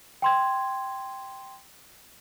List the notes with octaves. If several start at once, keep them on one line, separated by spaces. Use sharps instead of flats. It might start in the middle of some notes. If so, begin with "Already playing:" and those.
G5 C6 G#6